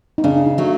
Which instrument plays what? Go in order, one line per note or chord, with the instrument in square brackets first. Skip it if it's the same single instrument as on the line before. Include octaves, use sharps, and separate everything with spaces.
[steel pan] D#4
[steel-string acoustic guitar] C#3 [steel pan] D4
[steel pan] D#4
[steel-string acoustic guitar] F#3 A3